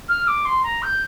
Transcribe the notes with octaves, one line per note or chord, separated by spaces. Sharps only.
F6
D6
C6
A#5
G6